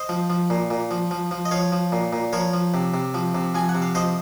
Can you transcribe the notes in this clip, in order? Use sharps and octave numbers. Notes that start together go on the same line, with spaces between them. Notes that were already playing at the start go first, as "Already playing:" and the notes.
Already playing: C5 D#5
F3
F3
A#2
A#2
F3
F3
F3
D#5
F3 C#5 F5
F3
A#2
A#2
F3 A#4 C#5
F3
C3
C3
F3
C3
F3 G#5
F#5
C3
F5
F3 C5 D#5